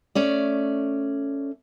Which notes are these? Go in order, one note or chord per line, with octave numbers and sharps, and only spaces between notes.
A3 C#4 D5